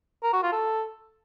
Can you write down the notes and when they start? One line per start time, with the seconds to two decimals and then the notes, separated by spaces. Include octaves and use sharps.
0.23 A#4
0.33 F#4
0.43 F4
0.52 A4